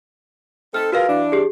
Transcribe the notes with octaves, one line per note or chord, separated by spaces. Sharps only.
C4 D#4 A4 F6
F4 F#4 G#4 A#4 B4 F5
E3 D4
G4 G#4